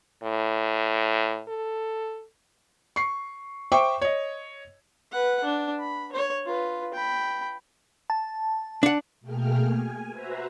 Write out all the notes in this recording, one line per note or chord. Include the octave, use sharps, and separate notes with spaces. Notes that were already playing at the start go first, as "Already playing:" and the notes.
A2
A4
C#6 C7
C5 E5 G5 C#6 D6
C#5 D#5
B4 F#5
D4
B5
C#5
F4 B4
G5 B5
A5
D4 F#5
B2 A3 A#3 G#4 G5 F6
G#5
F#4 B4 C5 E5 A#5